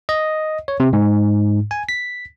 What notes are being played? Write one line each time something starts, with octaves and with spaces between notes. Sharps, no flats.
D#5
C#5
C3
G#2
G#5
B6